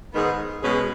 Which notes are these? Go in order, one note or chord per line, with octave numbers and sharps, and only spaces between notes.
G#2 D#3 B3 G#4
B2 G#3 C#4 G#4 B4